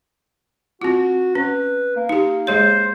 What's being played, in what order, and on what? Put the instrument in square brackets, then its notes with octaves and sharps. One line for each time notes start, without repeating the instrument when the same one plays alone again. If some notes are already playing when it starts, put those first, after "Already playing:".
[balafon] C4 F4 [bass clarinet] F#4
[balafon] C#4 [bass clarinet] B4
[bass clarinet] A#3
[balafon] D#4 G4
[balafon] G#3 G#4 C#5 [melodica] C5